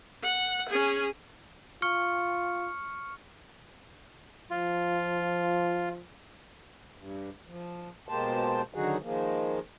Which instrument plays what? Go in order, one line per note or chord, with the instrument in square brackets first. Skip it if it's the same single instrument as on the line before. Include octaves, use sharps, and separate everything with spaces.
[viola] F#5
C#4 G#4
[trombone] F4 [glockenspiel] C#6 F6 C#7
[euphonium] F3 [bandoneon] F4
[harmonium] G2
F3
B2 G#3 A#3 G4 C5 A5
D3 D#3 F#3 D#4 F#4 G#4
D#3 F3 G#3 A#3